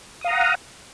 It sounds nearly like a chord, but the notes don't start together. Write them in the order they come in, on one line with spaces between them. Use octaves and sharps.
D#6 F5 A#5 F#5